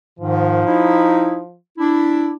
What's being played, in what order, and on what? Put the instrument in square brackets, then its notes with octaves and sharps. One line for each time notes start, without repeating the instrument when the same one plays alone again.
[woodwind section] G#2 D#3 [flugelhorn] F3
[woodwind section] D#4 E4
D4 E4